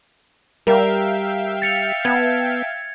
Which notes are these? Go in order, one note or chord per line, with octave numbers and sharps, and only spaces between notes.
G3 A#4 E5 F5 G5
A6 C#7 F7
B3 A5 G#6